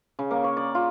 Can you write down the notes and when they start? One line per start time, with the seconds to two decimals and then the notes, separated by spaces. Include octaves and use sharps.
0.19 C#3
0.31 A#3
0.44 C#5
0.57 D5
0.75 F4